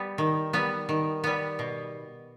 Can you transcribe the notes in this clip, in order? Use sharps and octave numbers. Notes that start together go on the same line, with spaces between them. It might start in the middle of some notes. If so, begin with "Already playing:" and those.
Already playing: G3 B3
D#3
G3 B3
D#3
G3 B3
B2